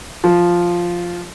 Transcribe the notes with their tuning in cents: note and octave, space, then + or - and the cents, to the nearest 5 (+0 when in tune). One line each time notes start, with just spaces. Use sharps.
F3 +0